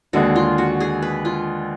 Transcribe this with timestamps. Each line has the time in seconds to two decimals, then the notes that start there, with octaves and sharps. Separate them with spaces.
0.13 D#2 D3 G#3 F#4
0.36 F4
0.58 F#4
0.80 G#4
1.02 B4
1.25 F4